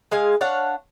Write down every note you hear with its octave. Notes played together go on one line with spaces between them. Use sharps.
G#3 G#4 F5 G#5
D4 C#5 F5 F#5